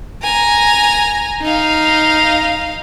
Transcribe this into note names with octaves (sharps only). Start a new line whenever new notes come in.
G#5 A#5
D#4 F5